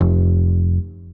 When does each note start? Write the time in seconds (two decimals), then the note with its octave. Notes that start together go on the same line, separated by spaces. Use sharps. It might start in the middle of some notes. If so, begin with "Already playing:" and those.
0.01 F1